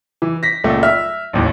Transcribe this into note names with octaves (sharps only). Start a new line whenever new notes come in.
E3
A#6 B6
C#2 A#2 A3
E5 F6
A1 D#2 A2